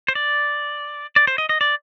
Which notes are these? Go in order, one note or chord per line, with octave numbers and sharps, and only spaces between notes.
C5
D5
D5
C5
D#5
D#5
D5